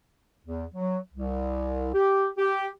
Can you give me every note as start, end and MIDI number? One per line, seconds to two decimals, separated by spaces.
0.46 0.66 40
0.75 0.98 54
1.14 1.90 36
1.94 2.28 67
2.38 2.68 67